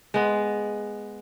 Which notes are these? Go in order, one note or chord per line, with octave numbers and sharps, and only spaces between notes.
G#3 B3